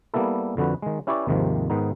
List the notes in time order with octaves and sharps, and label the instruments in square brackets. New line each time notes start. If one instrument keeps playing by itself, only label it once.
[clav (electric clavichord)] G3 A#3 B3 E4 A4
F2 D3 F#4 B4
D#3 G#3
C#4 E4 G4 B4 C#5 D5
D#2 G#2 C3 D#3 F3
G#2 D#3 B3 D#4